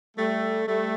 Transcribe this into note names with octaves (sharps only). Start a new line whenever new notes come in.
G3 A3
G3 A3